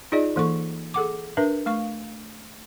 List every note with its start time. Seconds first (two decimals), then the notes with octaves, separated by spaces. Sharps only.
0.12 D#4 F4 G#4 D5 D#5
0.36 E3 A#3 A4 C#6
0.94 G#4 A4 F#5 D6
1.37 D4 A#4 B4 E5
1.66 A3 F5 C#6